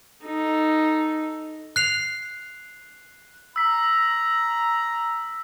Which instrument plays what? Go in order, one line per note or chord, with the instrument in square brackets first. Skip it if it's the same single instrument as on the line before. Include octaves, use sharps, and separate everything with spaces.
[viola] D#4 A4
[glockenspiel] F#6 C7 F7
[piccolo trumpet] A#5 [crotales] E6 B6